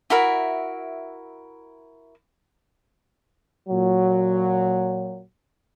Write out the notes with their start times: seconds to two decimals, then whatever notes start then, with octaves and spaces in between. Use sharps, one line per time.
0.10 E4 F#4 A#4 E5
3.69 A#2 F#3